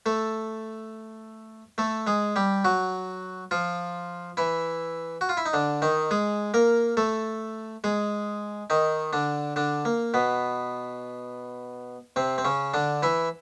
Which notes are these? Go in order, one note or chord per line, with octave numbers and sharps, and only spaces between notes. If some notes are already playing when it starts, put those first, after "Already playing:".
A3 A4
A3 A4
G#3 G#4
G3 G4
F#3 F#4
F3 F4
E3 E4
F#4
F4
E4
D#4
D3 D4
D#3 D#4
G#3 G#4
A#3 A#4
A3 A4
G#3 G#4
D#3 D#4
D3 D4
D3 D4
A#3
B2 B3
C3 C4
C4
C#3 C#4
D3 D4
E3 E4